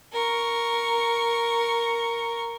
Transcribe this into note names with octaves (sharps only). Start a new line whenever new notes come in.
A#4 C#6